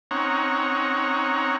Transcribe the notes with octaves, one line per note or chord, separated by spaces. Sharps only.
C4 C#4 D#4 C#5 F#5 A#5